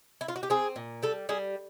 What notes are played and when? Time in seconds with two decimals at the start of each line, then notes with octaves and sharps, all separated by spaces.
0.21 E4
0.28 F4
0.36 F#4
0.43 G4
0.50 C4 G#4
0.76 A#2
1.03 G3 A4
1.29 G3 G#4